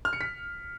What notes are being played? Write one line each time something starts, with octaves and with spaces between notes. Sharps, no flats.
F6
C#7
B6